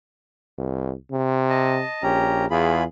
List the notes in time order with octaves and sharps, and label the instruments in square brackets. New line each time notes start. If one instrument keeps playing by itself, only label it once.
[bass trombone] C2
C3
[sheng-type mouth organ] D#5 A5
[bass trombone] A#1 [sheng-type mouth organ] C#4 G4 A#5
[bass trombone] E2 [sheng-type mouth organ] F4 G#4 B5